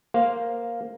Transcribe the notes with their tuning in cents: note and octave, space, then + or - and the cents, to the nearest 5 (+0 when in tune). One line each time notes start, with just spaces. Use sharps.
A#3 +5 C5 +0 F5 +0